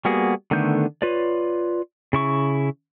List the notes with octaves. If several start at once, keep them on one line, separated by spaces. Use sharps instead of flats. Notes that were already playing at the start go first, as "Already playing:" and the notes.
G3 A#3 B3 F#4 G#4
D3 D#3 A3 B3 G6
F4 B4 C#5 D5
C#3 E4 C#6